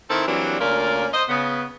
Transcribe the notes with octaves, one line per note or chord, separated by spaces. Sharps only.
D#3 C4 E4 A4 A#4
E3 F#3 G3 A#3 C4 D4
D2 A#3 C#4 F4 A#4 D5
C5 D#5
C#3 B3